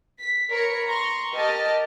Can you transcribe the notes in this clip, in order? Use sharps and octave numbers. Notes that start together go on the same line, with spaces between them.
B6
A#4 C#5 A#5 B5 C#7
A#5 C6 C#6
G4 A#4 D#5 A5 F6